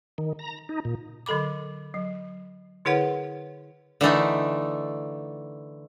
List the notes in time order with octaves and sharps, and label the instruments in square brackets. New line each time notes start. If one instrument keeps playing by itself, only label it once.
[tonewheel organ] D#3
A#5
D#4
A#2
[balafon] D3 F#3 A4 B5 D6
F#3
D3 E4 G#4 B4 C#5 F#5
[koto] D3 E3 A3 D#4